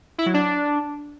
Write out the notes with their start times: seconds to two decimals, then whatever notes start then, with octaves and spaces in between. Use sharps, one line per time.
0.18 E4
0.26 F#3
0.34 D4